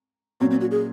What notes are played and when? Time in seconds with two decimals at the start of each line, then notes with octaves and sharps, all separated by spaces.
0.40 A#2 F#3 C4 C#4
0.51 C4
0.61 F#4
0.71 G#4